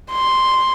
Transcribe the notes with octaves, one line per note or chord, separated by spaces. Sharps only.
C6